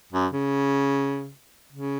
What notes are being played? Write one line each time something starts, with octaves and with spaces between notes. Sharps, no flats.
F#2
C#3
C#3